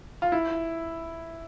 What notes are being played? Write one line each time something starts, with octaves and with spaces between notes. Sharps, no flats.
F4
E4